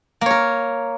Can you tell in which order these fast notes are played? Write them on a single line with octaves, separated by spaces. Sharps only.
A#3 C#5 A#4